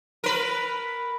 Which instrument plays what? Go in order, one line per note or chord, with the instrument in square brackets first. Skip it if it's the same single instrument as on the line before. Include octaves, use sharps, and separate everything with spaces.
[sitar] A#4 B4